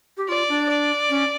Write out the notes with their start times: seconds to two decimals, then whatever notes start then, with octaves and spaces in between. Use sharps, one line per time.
0.17 G4
0.29 F4 D5
0.49 D4
0.69 D5
1.09 C#4